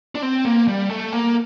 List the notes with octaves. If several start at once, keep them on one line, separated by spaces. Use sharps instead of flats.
D4
C4
A#3
G3
A3
A#3